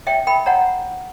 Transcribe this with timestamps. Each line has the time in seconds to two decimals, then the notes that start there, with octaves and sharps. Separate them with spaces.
0.07 C#5 E5 G5
0.27 A#4 G5 B5
0.46 C#5 F#5 A#5